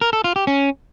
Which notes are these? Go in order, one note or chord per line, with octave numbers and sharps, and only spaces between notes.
A#4
A4
F4
G4
C#4